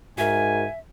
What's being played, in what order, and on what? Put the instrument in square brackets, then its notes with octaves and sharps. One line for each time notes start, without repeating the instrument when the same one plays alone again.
[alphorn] G#2 [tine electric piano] F#4 A#4 [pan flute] E5 [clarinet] G#5